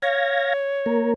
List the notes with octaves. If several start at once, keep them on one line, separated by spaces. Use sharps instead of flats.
C#5 F5 G#6 A#6
A#3 A#4